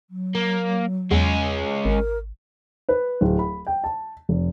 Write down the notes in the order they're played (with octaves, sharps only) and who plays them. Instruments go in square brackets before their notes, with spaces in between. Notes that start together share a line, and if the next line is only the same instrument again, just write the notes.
[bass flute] F#3
[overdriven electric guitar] A#3
[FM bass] E2 [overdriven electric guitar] G#3 C#4
[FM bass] G#1 [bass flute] A#4
[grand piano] B4
D1
B5
G5
A5
F1